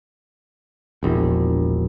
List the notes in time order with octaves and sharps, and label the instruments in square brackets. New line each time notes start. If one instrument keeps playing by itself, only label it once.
[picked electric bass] E1 A#1